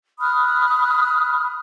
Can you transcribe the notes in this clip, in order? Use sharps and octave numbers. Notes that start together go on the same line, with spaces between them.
B5 D#6 F6 F#6